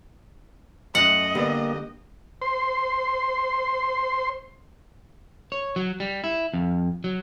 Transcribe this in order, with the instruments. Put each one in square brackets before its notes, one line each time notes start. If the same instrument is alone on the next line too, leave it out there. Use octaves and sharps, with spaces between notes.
[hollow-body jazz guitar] F#2 A3 [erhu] D#5 [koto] F#5
[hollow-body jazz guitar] D3 G3 B3 [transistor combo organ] A#3 G4
[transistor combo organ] C5 C6
[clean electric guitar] C#5
F#3
G3
E4
F2
F#3